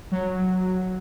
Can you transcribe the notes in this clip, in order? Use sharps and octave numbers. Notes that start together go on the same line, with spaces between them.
F#3